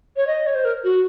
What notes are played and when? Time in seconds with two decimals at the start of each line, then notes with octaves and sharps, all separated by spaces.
0.17 C#5
0.27 D#5
0.46 C#5
0.55 C5
0.65 A#4
0.84 F#4